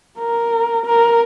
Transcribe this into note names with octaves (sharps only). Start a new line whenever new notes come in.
A#4
A#4